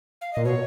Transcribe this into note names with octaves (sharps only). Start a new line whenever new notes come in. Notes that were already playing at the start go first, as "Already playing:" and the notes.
F5
A#2 D#5
B2 C#5